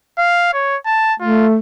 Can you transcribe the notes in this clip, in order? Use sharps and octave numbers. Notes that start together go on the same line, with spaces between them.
F5
C#5
A5
A3 F4